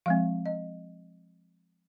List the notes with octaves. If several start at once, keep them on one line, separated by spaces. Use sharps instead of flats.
F3 G#3 C4 F5
D#5